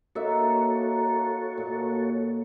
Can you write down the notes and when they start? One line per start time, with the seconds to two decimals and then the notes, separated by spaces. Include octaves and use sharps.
0.15 A#3 D#4 F#4 A4 C#5 E5
1.58 A#2